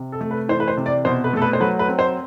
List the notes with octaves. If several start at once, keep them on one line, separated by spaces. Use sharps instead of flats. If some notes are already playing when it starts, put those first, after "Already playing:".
Already playing: C3
A4
A3
B4
E3 C5
B4
C5
C3
D5
B2 C5
B4
A3 A4
B4
C5
F#3 B4
B4
C4
C5